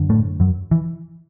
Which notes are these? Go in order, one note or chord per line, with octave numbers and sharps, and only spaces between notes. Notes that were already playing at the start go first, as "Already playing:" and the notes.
Already playing: F#2 D3
A2 A3
F#2 F#3
E3